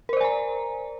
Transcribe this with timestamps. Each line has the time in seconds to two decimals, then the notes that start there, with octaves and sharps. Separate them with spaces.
0.09 A#4
0.13 C5
0.17 D5
0.21 G#5
0.24 A#5